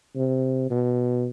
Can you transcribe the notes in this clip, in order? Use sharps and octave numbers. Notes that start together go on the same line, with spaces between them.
C3
B2